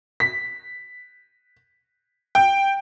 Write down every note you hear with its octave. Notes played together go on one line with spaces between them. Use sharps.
B6
G5